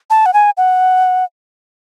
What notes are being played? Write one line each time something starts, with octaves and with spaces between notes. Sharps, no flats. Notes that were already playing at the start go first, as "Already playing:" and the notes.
A5
F#5
G#5
F#5